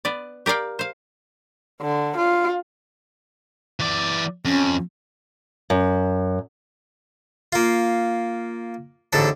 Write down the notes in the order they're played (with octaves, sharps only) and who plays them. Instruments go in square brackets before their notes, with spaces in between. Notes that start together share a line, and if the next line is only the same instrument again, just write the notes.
[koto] B3 B4 D5
G4 A#4 D5 F5 G5
C5 F5
[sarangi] D3
F4
[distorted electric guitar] E3 D5
[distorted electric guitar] F2 [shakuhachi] C#4
[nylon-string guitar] F#2
[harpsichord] A#3 F4
A1 G#2 D3 A4